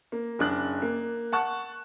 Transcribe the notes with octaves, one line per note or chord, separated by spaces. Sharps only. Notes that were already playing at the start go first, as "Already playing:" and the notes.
A#3
F#1 D4 F#6
A#3
F#5 A5 C#6 F#6